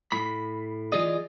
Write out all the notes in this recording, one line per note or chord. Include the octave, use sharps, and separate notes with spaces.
A2 B5
E3 F4 G#4 D5 D#5